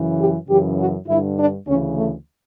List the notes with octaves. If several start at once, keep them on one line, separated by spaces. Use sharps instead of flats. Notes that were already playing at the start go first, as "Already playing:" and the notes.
Already playing: F#2 C#3 E3
G4
F#2 C#3 E3 G4
F#4
G2 D3 E4
D4
D2 C#3 E3 C#4
A3